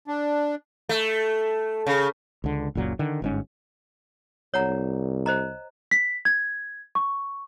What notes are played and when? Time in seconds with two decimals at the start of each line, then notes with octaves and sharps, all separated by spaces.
0.08 D4
0.89 A3
1.87 C#3
2.44 C#2 D3
2.75 F#1 C#2 A#2 F#3
2.99 D3 D#3
3.22 G1 G#2 C#4
4.54 C2 C#5 F#5 A#5
5.26 C5 D#5 A#5
5.91 B6
6.25 G#6
6.95 C#6